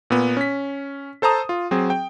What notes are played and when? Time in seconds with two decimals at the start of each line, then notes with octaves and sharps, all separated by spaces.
0.10 A#2 B3
0.37 C#4 B6
1.22 A4 C5 A5 A#5 D#6
1.49 F4
1.71 F#3 C4 G#4
1.90 G5